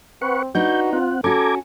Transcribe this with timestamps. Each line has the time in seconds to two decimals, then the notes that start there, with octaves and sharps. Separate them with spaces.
0.22 C4 B4 F#5 C#6
0.55 D4 D#4 F#4 B4 G6
0.93 C4 F4 F#5
1.24 C#4 F#4 A4 A#5 D6 G#6